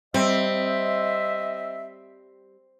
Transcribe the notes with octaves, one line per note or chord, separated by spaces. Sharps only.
G3 C4 D#5 E5